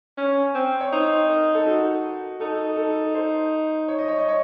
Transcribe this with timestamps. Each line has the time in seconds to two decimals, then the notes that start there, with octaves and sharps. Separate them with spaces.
0.17 C#4
0.54 C4
0.80 C#5
0.92 D#4 C5
1.29 A#4
1.55 A4
1.66 F#4
2.40 D#4 A4
2.77 A4
3.15 C5
3.88 C#5
3.99 D#5
4.08 C#5
4.18 D#5
4.28 C#5